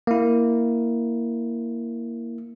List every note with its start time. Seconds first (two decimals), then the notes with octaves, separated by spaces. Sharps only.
0.07 A#3 E4